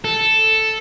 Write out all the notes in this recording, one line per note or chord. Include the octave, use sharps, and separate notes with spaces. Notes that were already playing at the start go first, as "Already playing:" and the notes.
A4